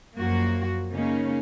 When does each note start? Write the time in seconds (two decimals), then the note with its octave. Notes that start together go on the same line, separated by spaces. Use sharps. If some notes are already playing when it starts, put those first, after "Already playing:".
0.16 F#2 F3 A#3 F#4
0.91 C#3 A#3 C#4 D#4